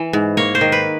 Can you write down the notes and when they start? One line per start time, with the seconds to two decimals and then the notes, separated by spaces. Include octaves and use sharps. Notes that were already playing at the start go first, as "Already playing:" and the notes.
Already playing: E3
0.13 G#2
0.37 A#3 C#5
0.55 C5
0.61 D#3
0.72 B4